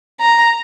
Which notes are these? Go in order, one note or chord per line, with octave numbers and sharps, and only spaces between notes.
A#5